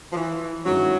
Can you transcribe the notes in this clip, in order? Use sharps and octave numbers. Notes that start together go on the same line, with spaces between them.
F3
E3
G2 D#3 F#3 G#3 C#4 E4